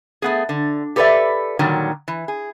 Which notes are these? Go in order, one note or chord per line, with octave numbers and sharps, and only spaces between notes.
A3 B3 G#4
D3
G4 A4 B4 C#5 D5 E5
A#2 D3 D#3 F#3 G3
E3
G#4